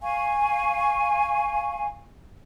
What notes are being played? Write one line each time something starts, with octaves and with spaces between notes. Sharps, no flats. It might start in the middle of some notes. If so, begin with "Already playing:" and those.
F5 G#5 C#6